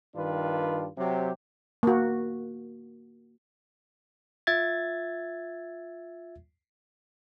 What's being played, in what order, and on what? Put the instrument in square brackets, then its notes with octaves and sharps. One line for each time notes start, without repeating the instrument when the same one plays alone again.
[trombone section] G2 D#3 D4 F4 B4
C3 F#3 C4 G4
[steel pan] A#3 F#4
[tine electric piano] F4 E5 G#6 A6